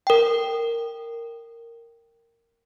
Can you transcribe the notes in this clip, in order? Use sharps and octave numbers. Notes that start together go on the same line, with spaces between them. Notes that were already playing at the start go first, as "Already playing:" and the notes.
A#4 G5